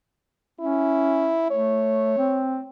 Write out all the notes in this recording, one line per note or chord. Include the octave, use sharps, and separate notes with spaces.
C#4 E4
A3 C#5
C4